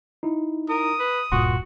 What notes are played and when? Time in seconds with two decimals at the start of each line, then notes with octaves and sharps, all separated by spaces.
0.23 D#4 E4
0.69 A#4 D#6
0.99 B4
1.32 D#1 C#2 G2 A#2 F#4 C6